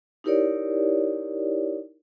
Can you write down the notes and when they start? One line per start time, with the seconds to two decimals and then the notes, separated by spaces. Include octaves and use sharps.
0.24 D#4 E4 G4 A#4 C#5 D5